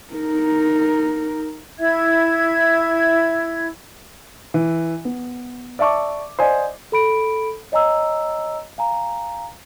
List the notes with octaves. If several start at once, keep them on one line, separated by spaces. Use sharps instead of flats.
D#4 A#4
E4 E5 G#6
E3
B3
D5 E5 A5 C#6 D6
C5 D5 D#5 F5 G#5
A4 B5 D7
C#5 D#5 G#5 A#5 E6
F5 G#5 A#5